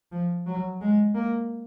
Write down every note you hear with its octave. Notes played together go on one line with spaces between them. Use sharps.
F3
F#3
G#3
A#3